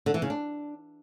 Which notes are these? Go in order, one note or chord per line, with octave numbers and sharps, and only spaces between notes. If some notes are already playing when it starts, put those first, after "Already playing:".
D3
E3
C#3
D4